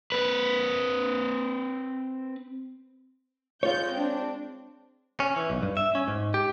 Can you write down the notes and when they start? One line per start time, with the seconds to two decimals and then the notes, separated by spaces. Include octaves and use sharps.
0.12 C4 B4
3.63 G#3 F4 C#5 G6
3.93 C4 D4
5.20 C#4
5.36 E3
5.50 B1
5.63 G2
5.77 E5
5.95 C#4
6.08 G#2
6.34 G4